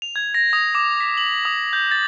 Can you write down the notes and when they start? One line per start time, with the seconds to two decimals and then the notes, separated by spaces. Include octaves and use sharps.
0.02 F7
0.16 G#6
0.34 A#6
0.53 D#6
0.75 D6
1.00 B6
1.17 F#7
1.45 D#6
1.73 G6
1.91 A6